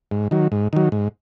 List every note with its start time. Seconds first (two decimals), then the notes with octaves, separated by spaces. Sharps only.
0.11 G#2
0.31 D#3 F#3
0.52 G#2
0.73 D#3 F#3
0.92 G#2